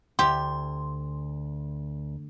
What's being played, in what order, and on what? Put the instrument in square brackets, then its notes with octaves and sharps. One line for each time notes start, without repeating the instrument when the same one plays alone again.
[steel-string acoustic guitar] D2 [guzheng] G4 [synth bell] C6